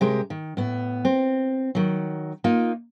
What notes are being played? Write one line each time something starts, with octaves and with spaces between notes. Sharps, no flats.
C3 G#3 G4 A#4
D#3
A2 B3
C4
D#3 F#3
A#3 D#4 F4